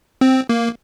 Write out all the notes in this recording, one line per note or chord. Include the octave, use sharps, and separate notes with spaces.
C4
A#3